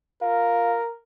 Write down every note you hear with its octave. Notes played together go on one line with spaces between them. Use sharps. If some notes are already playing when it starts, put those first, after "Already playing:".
F4 A#4